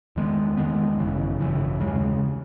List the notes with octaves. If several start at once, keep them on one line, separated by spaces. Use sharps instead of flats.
E2 D#3 G#3 B3
E2 D#3 G#3 B3
G#1 F#2 C#3 E3
G#1 F#2 C#3 E3
D#2 C#3 G#3